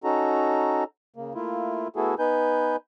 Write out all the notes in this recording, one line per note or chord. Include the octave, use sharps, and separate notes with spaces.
C#4 D#4 F#4 A4 A#5
C#3 A#3
A3 A#3 E4 F4
A3 B3 E4 F#4 G#4 A4
B3 D#4 B4 G#5 G6